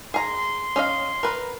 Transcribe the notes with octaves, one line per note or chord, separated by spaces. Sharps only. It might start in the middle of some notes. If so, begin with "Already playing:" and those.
G#4 A#5 C6
C#4 D#5 F5
A#4 B4